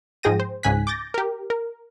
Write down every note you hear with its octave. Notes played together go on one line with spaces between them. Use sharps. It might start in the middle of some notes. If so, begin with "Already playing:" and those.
G#2 F3 G#4 G5 A#6 D#7
C5
C#2 G#2 C#3 G#5 F#6 B6
D6 G6 A6 A#6
G4 A#4
A#4